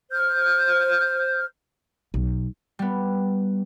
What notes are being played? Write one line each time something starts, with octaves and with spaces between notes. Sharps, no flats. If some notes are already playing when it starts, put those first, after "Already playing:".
C5 F6 G6
B1
G3 B3